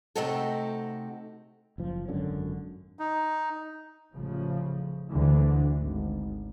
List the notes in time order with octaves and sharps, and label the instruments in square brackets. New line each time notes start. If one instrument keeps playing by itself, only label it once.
[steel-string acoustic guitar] C3 A3 C4 D#4 F#4 A4
[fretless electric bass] F#1 F3
G#1 F#2 D3 C#4
[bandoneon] D#4
[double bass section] A1 C#3 F3
D2 D3 E3
G#1